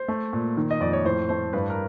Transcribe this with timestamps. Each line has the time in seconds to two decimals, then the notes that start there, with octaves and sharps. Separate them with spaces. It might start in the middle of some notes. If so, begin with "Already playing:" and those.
Already playing: C5
0.08 A3
0.33 A#2
0.57 D#3
0.71 D#5
0.80 F2 D5
0.93 C#5
1.05 A2 C5
1.29 A3 C5
1.53 G2 B4
1.70 A#4